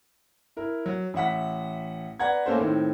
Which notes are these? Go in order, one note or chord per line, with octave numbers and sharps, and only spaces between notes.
E4 A#4
F#3
A1 E5 F#5 B6
B4 D5 F#5 A#5 G#6
A3 A#3 C#4 A4 C5
A2 D#3 C4